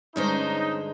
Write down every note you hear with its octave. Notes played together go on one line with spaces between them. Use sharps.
G2 D3 G#3 C#4 D#4 C5